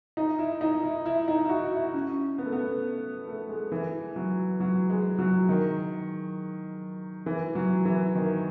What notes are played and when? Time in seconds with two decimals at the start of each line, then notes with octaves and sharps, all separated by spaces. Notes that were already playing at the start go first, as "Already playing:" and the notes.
0.17 D#4
0.39 E4
0.61 D#4
0.83 E4
1.06 E4
1.28 D#4
1.45 E4
1.49 F#4
1.72 E4
1.94 C#4
2.38 B3
2.45 A3
2.52 B3
3.28 A3
3.49 G#3
3.72 E3
4.16 F#3
4.60 F#3
4.89 G#3
5.19 F#3
5.49 D#3
7.26 E3
7.55 F#3
7.85 E3
8.15 D#3